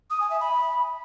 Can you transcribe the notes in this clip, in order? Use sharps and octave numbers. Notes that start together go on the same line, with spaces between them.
D#6
G#5
E5
B5